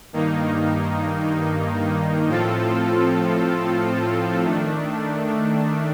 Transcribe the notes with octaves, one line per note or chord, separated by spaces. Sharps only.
G2 D#3 A#3 D#4
A2 F3 C4 F4 A4
D#3 A3 D4